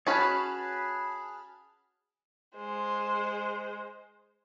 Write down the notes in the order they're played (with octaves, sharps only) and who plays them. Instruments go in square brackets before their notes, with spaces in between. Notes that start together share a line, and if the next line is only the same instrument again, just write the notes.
[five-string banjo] C#4 F#4 C#5 [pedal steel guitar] G#4 B4 [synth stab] A5 B5 F6
[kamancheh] G#3 C5